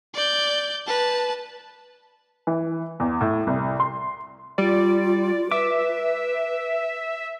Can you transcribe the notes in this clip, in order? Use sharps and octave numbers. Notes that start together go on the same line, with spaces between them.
D5 G6
B4 A5
E3
E2
A2
C2
C6
G3 F4 D5
B4 E5 D6